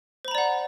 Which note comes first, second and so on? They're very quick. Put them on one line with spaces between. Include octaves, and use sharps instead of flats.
C5 B5 A#5 D5 F#5